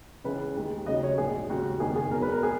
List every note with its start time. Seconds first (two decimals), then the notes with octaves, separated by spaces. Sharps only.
0.24 C#2 C#3 E3 G#3 B4
0.56 D#2 D#3 G#3
0.86 D#2 C#3 F#3 D#5
1.03 C#5
1.18 A#1 G#2 F#3 G#4
1.49 D#2 C#3 G#3 F#4
1.80 F#1 E2 D#3 G#4
1.96 G#4
2.11 E1 E2 B2 F#3 A#4
2.22 B4
2.32 A#4
2.43 G#4